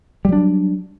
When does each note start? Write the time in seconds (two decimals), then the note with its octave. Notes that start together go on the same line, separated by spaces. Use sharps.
0.25 G3
0.29 F#3
0.33 D4